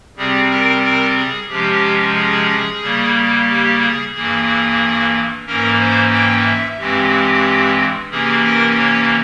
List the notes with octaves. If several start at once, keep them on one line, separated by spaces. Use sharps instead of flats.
C3 G3 C4 G#4
A#4
A#4
G#4
C3 F3 G#3 C#4 G4
G#4
C#3 G3 A#3
G4
G#4
G2 E3 A#3 G#4
G#2 E3 A#3 C#4 A#4
C5
G5
E5
G2 E3 G#3 C4 G4
C3 E3 A#3 C#4 G#4
A#4
C#5